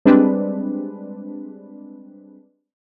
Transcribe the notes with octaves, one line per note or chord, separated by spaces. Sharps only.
G3 G#3 C4 D4 B4